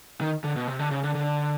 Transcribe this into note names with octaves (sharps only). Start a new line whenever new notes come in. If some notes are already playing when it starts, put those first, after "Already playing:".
D#3
D3
B2
C3
D3
C#3
D3
D3